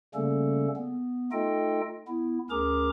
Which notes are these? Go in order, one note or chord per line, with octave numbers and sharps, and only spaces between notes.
C#3 G3 A3 A#3 C#4 A4
B3
A3 D#4 F4 A4 D#5 G5
B3 E4
D2 C#4 G#4 A#4 A#5 D6